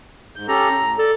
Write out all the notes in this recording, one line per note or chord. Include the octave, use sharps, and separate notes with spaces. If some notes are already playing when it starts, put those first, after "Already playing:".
G#2 G6
C#4 G4 A4 A#5
A2
A4 D5